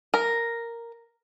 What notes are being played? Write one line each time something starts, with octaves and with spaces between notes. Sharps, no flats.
A#4